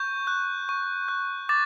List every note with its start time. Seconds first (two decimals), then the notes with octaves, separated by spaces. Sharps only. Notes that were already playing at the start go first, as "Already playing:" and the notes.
Already playing: C#6 G6
0.27 F#6
0.69 C#6
1.08 F#6
1.49 D6 A6